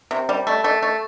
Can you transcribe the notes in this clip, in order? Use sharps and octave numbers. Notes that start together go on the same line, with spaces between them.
C3
G3
A3
A3
A3